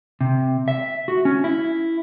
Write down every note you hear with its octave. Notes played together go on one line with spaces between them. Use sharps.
C3
E5
F#4
C#4
E4